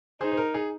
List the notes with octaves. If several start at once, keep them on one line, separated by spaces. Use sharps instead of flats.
D#4 G#4 C5
C5
A#4
G#4